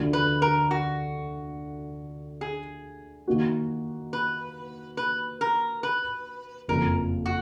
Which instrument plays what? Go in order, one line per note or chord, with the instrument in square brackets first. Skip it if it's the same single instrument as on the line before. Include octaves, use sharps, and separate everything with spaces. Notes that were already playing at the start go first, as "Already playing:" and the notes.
Already playing: [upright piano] D2 D3 F3
[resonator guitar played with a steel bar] B4
A#4
F#4
G#4
[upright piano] D#3 A#3 D#4 F#4
[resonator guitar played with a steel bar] B4
B4
A#4
B4
[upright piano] F#1 F2 F3 [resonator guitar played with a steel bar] A#4
[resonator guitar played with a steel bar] F#4